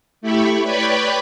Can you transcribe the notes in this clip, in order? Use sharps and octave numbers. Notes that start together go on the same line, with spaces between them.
A3 E4 G4 B5 C#6
B4 C#5 D5 G5 B5 C#6